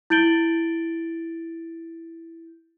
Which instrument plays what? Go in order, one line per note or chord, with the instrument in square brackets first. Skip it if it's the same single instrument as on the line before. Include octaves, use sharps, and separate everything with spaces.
[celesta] E4 G6 A6 D7 F#7 G7